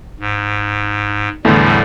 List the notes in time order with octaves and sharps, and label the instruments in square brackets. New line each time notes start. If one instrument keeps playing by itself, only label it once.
[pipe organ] G#2
[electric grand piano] E2 [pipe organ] A2 G3 [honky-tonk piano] D3 A3